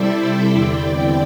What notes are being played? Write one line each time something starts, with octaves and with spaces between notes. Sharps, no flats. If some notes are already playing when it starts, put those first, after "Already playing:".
Already playing: C3 G3 E4 A4 C5 D5 E5
D5 G5
E2 D3 C4 E4